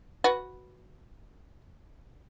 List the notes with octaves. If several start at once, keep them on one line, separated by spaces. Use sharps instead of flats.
F#4 B4